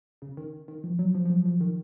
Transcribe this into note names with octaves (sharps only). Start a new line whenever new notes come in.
C#3
D#3
D#3
F3
F#3
F3
F3
F#3
F3
D#3